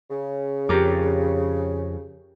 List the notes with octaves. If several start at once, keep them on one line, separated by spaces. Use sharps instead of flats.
C#3
F2 G4 A#4 D6